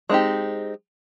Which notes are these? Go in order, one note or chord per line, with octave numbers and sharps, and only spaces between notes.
G#3 C4 D#4 G4